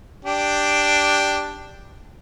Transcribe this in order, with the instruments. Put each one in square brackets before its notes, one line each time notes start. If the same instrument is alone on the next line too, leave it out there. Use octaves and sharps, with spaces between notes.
[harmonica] D4 G4